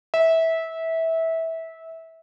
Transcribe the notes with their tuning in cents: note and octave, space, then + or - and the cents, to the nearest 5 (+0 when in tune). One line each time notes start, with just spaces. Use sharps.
E5 -20